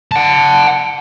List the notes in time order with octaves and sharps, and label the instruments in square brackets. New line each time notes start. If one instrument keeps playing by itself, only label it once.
[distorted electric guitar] F#5 A5